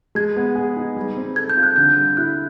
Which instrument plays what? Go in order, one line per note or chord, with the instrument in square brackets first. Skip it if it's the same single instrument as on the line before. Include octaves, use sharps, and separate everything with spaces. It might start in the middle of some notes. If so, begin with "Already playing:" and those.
[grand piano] G#3 [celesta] G#6
[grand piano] B3
G#4
D#4
G3
C4
[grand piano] A4 [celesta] G#6
[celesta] G6
[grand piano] F4
[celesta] F#6
[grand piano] D3 [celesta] G6
[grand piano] G3
[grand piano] E4 [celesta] F#6